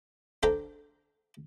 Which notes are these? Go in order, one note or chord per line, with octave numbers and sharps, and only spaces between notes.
D4 A4 C5 D5 G5 A#5